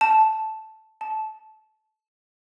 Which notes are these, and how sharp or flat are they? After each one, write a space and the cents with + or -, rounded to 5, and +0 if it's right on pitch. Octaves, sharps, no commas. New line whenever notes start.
A5 -5
A5 -20